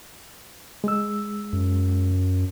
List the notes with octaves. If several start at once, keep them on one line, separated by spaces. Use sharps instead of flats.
G#3 E6
F#2